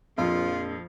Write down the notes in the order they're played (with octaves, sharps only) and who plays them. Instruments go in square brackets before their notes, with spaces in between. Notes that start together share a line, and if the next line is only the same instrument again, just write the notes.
[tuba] A#1 [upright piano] F2 [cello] F3 [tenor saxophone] F4